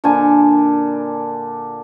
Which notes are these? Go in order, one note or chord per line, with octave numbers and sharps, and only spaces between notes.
A#2 D3 D4 G#5